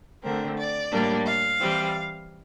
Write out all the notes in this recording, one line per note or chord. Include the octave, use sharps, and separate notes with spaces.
D3 A3 C4 A#4
D5
A2 G3 A#3 D4
F5
E3 G3 C4